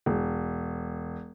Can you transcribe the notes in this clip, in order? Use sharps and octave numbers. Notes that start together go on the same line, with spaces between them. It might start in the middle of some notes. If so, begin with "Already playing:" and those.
E1